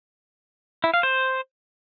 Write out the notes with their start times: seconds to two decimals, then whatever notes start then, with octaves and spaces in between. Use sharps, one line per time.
0.84 E4
0.94 F5
1.03 C5